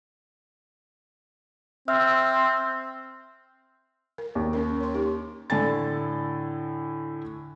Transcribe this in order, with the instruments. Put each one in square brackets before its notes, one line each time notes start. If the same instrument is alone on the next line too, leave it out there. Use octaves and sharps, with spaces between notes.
[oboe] C4 [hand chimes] E5 E6 F6
[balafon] A#4
[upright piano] D#2
[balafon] A#3 C#4 A#4
C#5 C6
D#4 G4
[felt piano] A2 D3 A4 G#5 A6